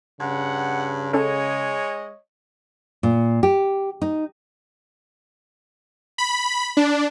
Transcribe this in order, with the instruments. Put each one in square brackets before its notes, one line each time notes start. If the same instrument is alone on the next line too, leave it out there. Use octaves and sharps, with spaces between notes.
[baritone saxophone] G2 [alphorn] C#3 [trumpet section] F#5
[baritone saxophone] G#3 [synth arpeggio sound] C#4 A4 [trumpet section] C#5 D#5
[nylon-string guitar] A#2
G4
D#4
[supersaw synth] B5
D4